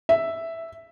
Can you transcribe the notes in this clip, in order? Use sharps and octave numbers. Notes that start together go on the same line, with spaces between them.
E5